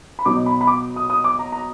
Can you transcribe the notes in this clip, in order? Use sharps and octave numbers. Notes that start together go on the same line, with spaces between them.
B5
B2 F#3 B3 D#4 D6
B5
B5
D6
D#6
D#6
D6
A#5
A#5